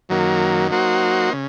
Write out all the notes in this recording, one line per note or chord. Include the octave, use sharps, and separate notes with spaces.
F#2 D#3 F#3 A#3
F#3 A#3 D#4 F#4 C5
C#3